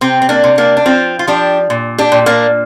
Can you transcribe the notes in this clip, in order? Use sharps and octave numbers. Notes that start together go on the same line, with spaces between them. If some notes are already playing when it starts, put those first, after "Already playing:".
C3 C4
C4
A#3 D4
C3
A#3 D4
D4
F3 C4 F4
F4
F3 D4 G4
A#2
D4 G4
A#2
A#3 D4